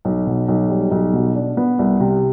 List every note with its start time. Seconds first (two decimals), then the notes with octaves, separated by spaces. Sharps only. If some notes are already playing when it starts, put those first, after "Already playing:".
0.05 B1
0.27 B2
0.48 B1
0.70 G3
0.91 B1
1.13 B2
1.36 D4
1.57 B3
1.79 C2
2.00 C3